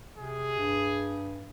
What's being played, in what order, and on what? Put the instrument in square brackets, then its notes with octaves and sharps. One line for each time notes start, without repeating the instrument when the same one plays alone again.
[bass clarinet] C3 [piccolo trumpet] G#4
[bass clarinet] G2